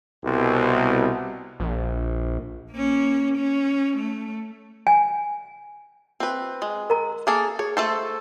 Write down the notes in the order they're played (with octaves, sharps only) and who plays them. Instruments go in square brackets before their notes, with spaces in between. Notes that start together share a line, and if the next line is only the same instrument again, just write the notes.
[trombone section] C2 B2
[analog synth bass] A#1
[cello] A#3 C#4
C#4
A3
[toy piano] G#5
[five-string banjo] C4 B4
G#3
[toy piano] A#4 A#5
[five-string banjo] A#3 G#4 A4
[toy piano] G#4 [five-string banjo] C#5
[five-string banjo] A3 A4 C5